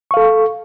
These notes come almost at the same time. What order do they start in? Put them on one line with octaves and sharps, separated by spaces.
C#6 F5 A4